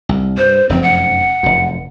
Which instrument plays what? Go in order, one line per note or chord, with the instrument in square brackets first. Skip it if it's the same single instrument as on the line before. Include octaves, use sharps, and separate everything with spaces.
[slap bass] C2
[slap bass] G2 [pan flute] C5
[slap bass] F1 F#2 F3 [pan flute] C4
[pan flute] F#5
[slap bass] F1 F#2